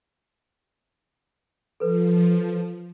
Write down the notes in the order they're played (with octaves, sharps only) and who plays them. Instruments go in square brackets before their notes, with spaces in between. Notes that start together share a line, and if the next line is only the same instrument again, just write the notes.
[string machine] F3 [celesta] A4 B4